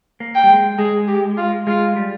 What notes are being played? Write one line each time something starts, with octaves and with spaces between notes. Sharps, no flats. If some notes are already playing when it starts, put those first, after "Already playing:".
A#3
G5
G3
G#3
G#3 G#4
G4
F4
G#3 F4
G3